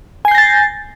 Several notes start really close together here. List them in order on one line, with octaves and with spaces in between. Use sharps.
G#5 C7 G6 A#6 A6